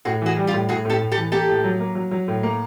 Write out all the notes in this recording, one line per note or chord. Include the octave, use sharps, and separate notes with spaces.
A2 F#4 G#4
E3 F#4 G#4
G3
F4 G4
A2
A2 F#4 G#4
A2 G4 A4
A2
G4 A4
E3
A#3 G4 A4
A2
F#3
A#3
F#3
F#3
A2
A#3